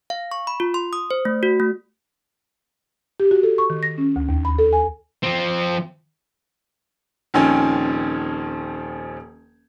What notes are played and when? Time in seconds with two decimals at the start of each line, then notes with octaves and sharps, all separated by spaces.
0.10 F5
0.31 C#6
0.47 B5
0.60 F4
0.74 C6
0.93 D#6
1.11 C5
1.25 A3
1.43 F#4
1.60 A3
3.20 G4
3.31 F#4
3.43 A4
3.58 C#6
3.70 D#3
3.83 A#6
3.98 C#4
4.16 D2
4.29 D#2
4.45 B5
4.59 A4
4.73 G#5
5.23 F3 C4
7.34 D#1 D#3 F3 C4 C#4 G#5